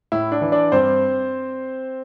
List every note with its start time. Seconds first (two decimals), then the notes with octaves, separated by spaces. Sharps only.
0.12 A2 E4
0.32 D4
0.41 E3
0.52 D4 D5
0.72 G2 C4 C5